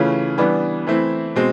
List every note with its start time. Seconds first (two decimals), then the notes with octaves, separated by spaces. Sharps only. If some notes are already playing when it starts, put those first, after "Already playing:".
Already playing: C#3 E3 A3 C#4 F4
0.38 E3 G3 B3 D4
0.87 E3 A3 C4 E4
1.36 B2 G#3 C4